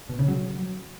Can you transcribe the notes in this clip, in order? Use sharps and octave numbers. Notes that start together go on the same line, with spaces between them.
B2
C#3
F#3